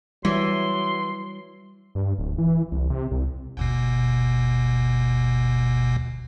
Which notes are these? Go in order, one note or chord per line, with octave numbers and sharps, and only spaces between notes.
E3 F#3 G3 C6
G2
D1
E3
C2
C3
C2
G1 D#2 B2